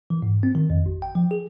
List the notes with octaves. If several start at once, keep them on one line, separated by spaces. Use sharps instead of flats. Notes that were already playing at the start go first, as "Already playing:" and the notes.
E3
G#2
C4
D#3
F2
G#1
G5
F3
G#4